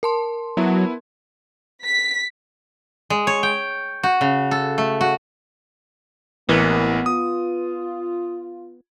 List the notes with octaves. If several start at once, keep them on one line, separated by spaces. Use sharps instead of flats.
A#4 A5 C6
F#3 B3 E4
B6
G#3
C#5
G5
F#4
C#3
A4
A3
F#4
A1 C3 E3 F#3 A#3 B3 A#4
F4 D#6